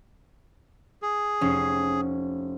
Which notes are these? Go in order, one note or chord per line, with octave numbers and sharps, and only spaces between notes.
G#4
F1 C#4 C7